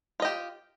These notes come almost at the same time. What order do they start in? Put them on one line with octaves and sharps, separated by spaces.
F4 D#5 G4